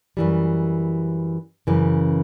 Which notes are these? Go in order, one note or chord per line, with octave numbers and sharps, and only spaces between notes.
F#2 E3 G3
F#2 C#3 E3